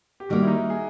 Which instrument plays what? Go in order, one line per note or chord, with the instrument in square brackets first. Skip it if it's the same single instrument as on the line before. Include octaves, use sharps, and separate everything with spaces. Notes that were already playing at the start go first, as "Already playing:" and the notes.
[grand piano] G4
[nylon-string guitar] D#3 G3 A#3 [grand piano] F#4
[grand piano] E4
D#4
G#4